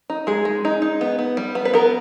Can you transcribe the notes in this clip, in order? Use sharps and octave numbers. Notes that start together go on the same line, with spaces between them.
D#4
G#3 G#4
G#3
D#4
D#4
B3
B3
G3
B3
B4
B3 A#4